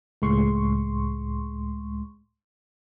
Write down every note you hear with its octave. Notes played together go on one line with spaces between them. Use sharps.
C#2 A2 G#3 C6 C#6